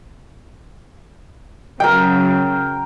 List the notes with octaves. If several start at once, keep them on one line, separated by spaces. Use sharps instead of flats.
C#3 F#3 A#4 G5